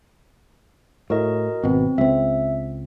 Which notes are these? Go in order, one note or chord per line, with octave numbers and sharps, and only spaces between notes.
A2 F#4 A#4 D#5
G#1 B2 C4
C#2 C4 E5